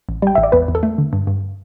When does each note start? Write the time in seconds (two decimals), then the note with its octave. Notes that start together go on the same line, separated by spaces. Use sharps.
0.09 A1
0.22 G3 G5
0.35 A1 E5
0.43 D5
0.52 E2 B4
0.68 E2
0.75 A4
0.83 A3
0.98 D3
1.13 G2
1.27 G2